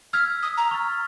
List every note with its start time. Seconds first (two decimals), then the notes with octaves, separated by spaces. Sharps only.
0.13 E6 F6 G#6 B6
0.43 D#6
0.57 A#5
0.71 C#6 F6 A6